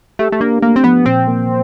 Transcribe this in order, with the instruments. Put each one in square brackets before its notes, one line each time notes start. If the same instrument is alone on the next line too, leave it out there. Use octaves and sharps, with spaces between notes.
[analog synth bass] A3 [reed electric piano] G4
[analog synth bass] A3
[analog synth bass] A#3 [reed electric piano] D4
[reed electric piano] A3 [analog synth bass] A#3
[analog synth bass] C4
[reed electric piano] F3 [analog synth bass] B3
[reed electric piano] A#2 [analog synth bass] C4
[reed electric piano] A#3